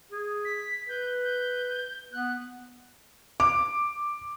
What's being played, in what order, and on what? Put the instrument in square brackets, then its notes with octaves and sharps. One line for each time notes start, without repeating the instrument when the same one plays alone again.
[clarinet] G#4
[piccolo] B6
[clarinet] B4 [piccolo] G6
[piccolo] G6
[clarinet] B3 [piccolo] F#6
[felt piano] D6